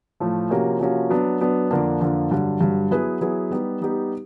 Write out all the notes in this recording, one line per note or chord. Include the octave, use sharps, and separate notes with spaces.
A2 F3 A3
C3 F3 A#3 C#4 F#4
C3 F3 A#3 C#4 F#4
F#3 B3 D4
F#3 B3 D4
F2 D3 F3 A#3 D4
F2 D3 F3 A#3 D4
G2 D3 F#3
G2 D3 F#3
F#3 B3 E4 G#4 B4
F#3 B3 E4 G#4 B4
G3 B3 D#4 G4
G3 B3 D#4 G4